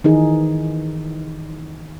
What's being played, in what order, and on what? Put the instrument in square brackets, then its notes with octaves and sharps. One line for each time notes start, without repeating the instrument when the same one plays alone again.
[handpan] D#3 E3 D#4 G#4